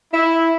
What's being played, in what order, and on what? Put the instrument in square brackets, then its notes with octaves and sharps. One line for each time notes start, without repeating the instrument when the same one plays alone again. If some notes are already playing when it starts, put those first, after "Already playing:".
[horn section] E4